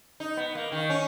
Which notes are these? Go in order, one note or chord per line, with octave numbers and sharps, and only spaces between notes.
D#4
B3
A#3
D#3
C#4